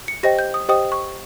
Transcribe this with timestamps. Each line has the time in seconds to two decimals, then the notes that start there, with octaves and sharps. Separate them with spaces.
0.08 C#7
0.23 G4 C5 D#5 G5 A#6
0.39 G6
0.54 D#6
0.69 G4 C5 D#5 G5 D#6
0.92 C#6